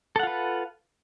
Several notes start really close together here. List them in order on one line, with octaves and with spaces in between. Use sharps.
A4 F#5 F4 B4